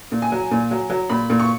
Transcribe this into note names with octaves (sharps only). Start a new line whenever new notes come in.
A#2
G#5
F#3
A#2
F#3
F#3
A#2 B5
A#2
C#6